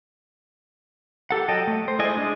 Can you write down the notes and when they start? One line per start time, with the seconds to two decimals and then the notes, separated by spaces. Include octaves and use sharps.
1.31 G4 A4 F#5
1.48 F#3 D#5 G5 A5
1.67 A3
1.88 C5
1.99 G#3 E4 D5 D#5 G#5
2.17 G#3 D4